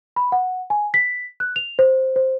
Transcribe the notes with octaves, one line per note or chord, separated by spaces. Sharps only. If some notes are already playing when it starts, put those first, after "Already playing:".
B5
F#5
G#5
B6
F#6
F7
C5
C5